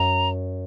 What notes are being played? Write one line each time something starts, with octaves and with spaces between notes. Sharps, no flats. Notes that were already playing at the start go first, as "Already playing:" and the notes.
Already playing: F#2 A#5